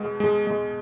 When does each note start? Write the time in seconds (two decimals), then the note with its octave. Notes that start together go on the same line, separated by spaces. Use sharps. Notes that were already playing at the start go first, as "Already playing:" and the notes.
Already playing: B2 G#3
0.20 G#3
0.47 G#3